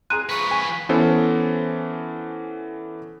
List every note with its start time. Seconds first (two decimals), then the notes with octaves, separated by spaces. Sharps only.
0.10 G#4 A#5 C6 F#6 D#7
0.30 F3 B4 C#6
0.51 G#5
0.89 E3 B3 C#4 A4 C5